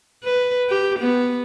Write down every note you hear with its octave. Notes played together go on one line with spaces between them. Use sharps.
B4
G4
B3